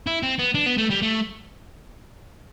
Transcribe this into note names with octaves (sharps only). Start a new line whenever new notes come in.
E4
C4
B3
D4
B3
A3
G3
A3